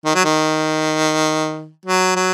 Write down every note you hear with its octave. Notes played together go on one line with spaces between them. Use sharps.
D#3
F#3
D#3
F#3
F#3